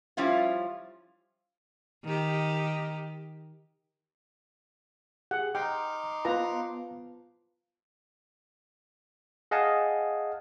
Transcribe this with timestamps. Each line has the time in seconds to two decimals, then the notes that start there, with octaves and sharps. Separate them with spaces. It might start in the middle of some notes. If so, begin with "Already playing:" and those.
0.17 F3 G3 C#4 E4 F4
2.04 D#3 G4
5.31 G4 G#4 F#5
5.55 D#4 G5 A#5 C6 D6 F6
6.25 B3 F4 B4 F5 A5 A#5
9.51 G#4 D#5 F5 F#5 G#5 A5